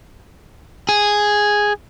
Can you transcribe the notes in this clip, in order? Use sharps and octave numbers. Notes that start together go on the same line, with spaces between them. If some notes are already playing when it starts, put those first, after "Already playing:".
G#4